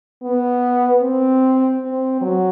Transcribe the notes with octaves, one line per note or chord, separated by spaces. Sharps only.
B3
C4
C4
F#3